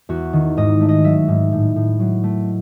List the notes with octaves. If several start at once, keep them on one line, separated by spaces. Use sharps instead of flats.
E2 F#4
D#3
G#2 D#5
A3
D#5
F#3 E5
G#2
A2
A2
F#3
A3